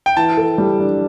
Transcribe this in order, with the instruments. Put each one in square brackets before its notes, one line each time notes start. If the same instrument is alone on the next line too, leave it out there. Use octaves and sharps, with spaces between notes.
[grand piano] G5
[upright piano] E3 [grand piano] A5
[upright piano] A4
G3
D4